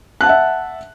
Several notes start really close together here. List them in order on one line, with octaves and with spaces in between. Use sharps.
F#6 A5 F#5 E5